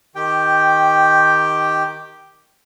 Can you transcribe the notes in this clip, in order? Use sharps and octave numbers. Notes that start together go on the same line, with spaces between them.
D#3 G4 G5